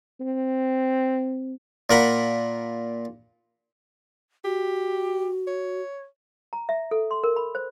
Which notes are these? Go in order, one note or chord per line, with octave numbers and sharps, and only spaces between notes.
C4
A#2 A#4 F#5 B5
F#4 G4
C#5
A#5
E5
A4
C6
A#4
B5
C5